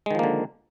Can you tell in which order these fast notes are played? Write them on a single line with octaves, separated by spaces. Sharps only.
G#3 D#3 F3 A#3 D3